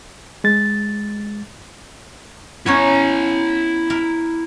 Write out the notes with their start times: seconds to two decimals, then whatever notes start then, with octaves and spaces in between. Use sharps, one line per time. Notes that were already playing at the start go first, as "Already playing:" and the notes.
0.44 G#3 A6
2.66 B3 C#4 E4 C#5 A#5
3.90 A#4